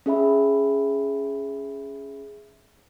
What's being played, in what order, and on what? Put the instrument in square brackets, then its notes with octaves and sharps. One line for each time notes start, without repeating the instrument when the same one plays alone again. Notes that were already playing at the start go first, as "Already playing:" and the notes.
[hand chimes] C#4 G#4 E5 B5